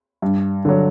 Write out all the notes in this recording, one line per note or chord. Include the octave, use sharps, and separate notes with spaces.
G2
D3 F#3